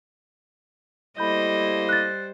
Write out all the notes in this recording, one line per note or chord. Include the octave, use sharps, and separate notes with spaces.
G3 A3 A#3 E4 C5 D#5 B5 G6
F#6 A6